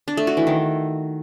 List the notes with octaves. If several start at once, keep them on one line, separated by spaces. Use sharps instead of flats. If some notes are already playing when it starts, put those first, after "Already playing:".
D4
A3
F#4
E3
D#3